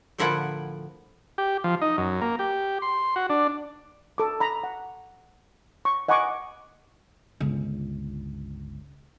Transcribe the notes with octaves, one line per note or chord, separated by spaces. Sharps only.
A2 D3 F3 E4 A#4 F#5
G4
F3
D#4
F#2
A#3
G4
C6
F#4
D4
A4 D6
A#5 B5
F#5
C#6
D#5 F#5 G#5 B5 C#6 D6
G1 C#2